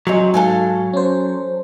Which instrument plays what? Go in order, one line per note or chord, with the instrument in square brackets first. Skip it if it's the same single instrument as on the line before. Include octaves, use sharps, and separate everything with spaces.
[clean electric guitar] F#3 [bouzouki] C4 C#4 D#4
[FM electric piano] G#2 [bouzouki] A4 F5 G#5
[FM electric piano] C#4 C5